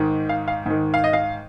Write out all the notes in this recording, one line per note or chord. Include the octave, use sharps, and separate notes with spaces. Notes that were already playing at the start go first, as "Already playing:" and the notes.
Already playing: G#2 D#3
F5
F5
G#2 D#3
F5
D#5
F5